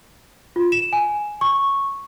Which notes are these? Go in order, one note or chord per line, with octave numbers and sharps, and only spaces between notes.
F4
E7
G#5
C#6